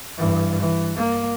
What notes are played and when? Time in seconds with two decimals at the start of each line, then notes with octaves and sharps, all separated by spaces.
0.17 G2 E3
0.60 E3
0.97 A#3